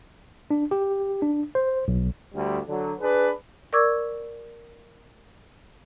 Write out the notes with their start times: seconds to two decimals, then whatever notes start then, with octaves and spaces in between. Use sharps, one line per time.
0.51 D4
0.71 G4
1.22 D4
1.55 C5
1.88 B1
2.33 D2 G3
2.67 D3 F#3
2.99 D4 G#4 B4
3.73 A#4 D5 C#6 D6 E6 G#6